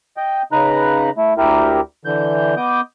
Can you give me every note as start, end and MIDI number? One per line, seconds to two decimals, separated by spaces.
0.17 0.42 75
0.17 0.42 79
0.52 1.10 49
0.52 1.10 63
0.52 1.10 71
0.52 1.10 82
0.52 1.10 90
1.17 1.34 57
1.17 1.34 64
1.38 1.80 38
1.38 1.80 64
1.38 1.80 67
1.38 1.80 70
2.05 2.55 50
2.05 2.55 52
2.05 2.55 91
2.57 2.81 59
2.57 2.81 75
2.57 2.81 86
2.57 2.81 87
2.57 2.81 91